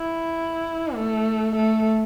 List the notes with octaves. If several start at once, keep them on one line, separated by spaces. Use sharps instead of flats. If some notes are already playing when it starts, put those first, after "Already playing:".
Already playing: E4
A3
A3